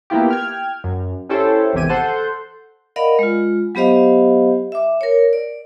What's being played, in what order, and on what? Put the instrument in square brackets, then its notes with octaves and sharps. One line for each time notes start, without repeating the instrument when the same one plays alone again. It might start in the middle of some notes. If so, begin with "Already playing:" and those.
[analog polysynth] A#3 B3 E4 F4 G4
G5 F6 G#6
F#2
C#4 E4 G4 A4 C5 C#5
G#1 E2 C3 G4 G#5 D#7
A4 C5 F#5 C6 G6
[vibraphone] A#4 D5 D#5 F5 F#5 B5
G#3 F4
F#3 B3 G4 C5 D#5 F5
E5 D6
A#4 C#5
D5